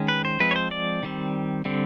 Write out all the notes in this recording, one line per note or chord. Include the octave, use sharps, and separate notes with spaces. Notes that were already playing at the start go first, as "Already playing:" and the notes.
Already playing: D#3 G#3 C#4
B4
C5
F3 G#3 C4 B4
C#5
C5
D5
D#3 G3 C4
D3 G3 C4